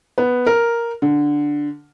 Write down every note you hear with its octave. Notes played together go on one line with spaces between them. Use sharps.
B3
A#4
D3